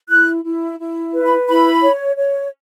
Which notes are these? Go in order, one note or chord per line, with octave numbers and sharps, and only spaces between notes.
E4 F#6
E4
E4
B4
B5
E4 B5
C#5
C#5